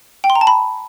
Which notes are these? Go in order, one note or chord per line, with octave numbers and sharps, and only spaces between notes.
G5
C6
A#5
A5
B5